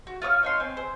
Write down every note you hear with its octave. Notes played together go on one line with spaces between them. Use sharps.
F#4
F4 C#5 D#6 F6
D#4 C#5 C6
C4 G#5
C5